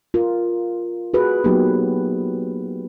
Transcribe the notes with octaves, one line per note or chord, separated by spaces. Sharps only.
F4 A#4
F#4 G#4 B4
F#3 A#3 B3 D#4 G4